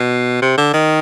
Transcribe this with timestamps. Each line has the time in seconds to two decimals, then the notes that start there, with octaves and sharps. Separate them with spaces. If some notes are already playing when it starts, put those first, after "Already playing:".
Already playing: B2
0.42 C3
0.58 D3
0.73 D#3